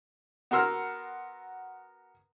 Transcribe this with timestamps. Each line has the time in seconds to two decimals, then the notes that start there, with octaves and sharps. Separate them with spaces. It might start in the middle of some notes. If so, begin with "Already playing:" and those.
0.51 B3 F#4 A#4 C6 E6 F6